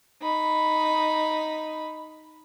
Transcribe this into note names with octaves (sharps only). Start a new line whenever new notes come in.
D#4 B5